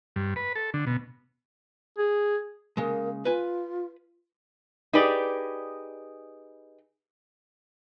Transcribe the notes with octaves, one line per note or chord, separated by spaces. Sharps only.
G2
B4
A4
D3
B2
G#4
C#3 G#3 A#3
F4 B4 G#5
D#4 G4 G#4 B4 D5